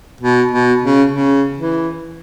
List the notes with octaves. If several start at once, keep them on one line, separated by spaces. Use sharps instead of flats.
B2
B2
C#3
C#3
E3